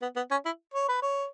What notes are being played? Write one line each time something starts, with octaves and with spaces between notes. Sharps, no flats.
B3
B3
C#4
E4
C#5
B4
C#5